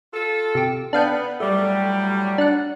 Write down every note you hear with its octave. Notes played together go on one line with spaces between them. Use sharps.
F4 A4
C3 G4
B3 D4 F5 G5
A2 F#3 G3 A3
D4 F#5